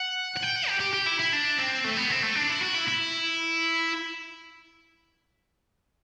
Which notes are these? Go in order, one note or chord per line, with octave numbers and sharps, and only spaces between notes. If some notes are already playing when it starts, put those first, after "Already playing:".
Already playing: F#5
F#5
G5
F#5
G4
G4
G4
E4
E4
D4
C4
A3
B3
C4
A3
D4
E4
F#4
E4
E4